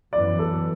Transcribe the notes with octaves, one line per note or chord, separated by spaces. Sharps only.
F#2 E3 B3 D5
A4